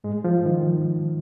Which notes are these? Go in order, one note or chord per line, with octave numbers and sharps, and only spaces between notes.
G#2 G#3
F3
D#3